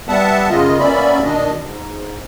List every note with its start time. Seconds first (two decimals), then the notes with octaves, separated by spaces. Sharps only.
0.08 G3 B3 E5 F#5 A5
0.50 F#2 C#3 F4 D#5
0.80 A#3 B3 C#4 D5 E5 B5
1.24 B2 D#3 D4 D#5
1.63 G#2